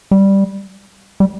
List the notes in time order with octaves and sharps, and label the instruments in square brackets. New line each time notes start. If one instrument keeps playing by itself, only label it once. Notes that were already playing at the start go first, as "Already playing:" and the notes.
[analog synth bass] G3
G3